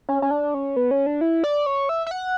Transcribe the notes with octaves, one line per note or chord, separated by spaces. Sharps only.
C#4
C#4
D4
C#4
B3
C#4
D4
E4
D5
C#5
E5
E5
F#5